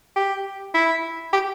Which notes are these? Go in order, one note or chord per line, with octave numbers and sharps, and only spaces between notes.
G4
E4
G4